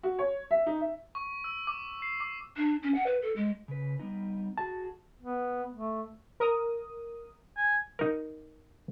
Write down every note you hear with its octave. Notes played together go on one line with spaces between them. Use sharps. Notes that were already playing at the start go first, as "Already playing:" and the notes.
F#4
C#5
E5
D#4
E5
C#6
E6
D6
C7
D6
D4
C#4
F#5
B4
A4
G#3
C#3 B4
G3 B3 D#4
F#4 G#4 A5
B3
A3
A#4 D#6
G#5
D#4 A#4